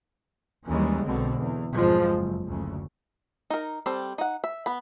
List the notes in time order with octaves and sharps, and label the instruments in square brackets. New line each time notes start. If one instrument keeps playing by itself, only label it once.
[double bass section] D#2 E3 G3 G#3 C#4
B1 B2 D3 C4
E2
B1 F2 G#2 B2 F3 G#3
F#1
F#1 D2 C#3
[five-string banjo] D#4 A#4
G3 C4 A4
D#4 F#5
E5
B3 B5